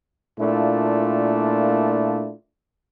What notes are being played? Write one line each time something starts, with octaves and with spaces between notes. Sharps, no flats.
A#2 A3 A#3 D4 E4 F4